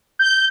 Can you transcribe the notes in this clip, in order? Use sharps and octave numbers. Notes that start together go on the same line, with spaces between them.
G6